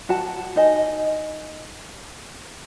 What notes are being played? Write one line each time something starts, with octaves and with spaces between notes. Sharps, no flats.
F#4 A5
D#4 D#5 G#5